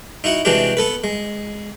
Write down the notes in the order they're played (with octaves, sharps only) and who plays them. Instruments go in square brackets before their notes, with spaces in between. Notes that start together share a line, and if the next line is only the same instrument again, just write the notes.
[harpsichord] D#4 E4 F#4 F#5
C3 E3 G#3 D4 F#4 G4
B3 A4 B4
G#3